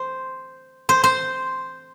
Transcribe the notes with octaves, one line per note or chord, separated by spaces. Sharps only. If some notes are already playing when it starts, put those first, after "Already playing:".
Already playing: C5
C5
C5